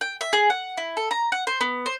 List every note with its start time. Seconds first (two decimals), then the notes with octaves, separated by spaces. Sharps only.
0.01 G5
0.21 E5
0.33 G#4
0.50 F#5
0.77 E4
0.97 A4
1.11 A#5
1.32 F#5
1.47 C5
1.61 B3
1.86 C5